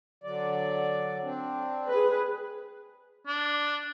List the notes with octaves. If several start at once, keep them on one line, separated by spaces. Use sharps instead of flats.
D3 F#3 D5
C4 D4
G#4 B4
D4